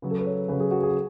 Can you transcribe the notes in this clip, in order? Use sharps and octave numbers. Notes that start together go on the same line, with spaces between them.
C#3 F#3 B4
A4
B4
C#5
C#3 F#3 B4
G#4
F#4
G#4